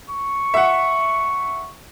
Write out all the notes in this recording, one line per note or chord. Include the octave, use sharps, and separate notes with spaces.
C#6
E5 F#5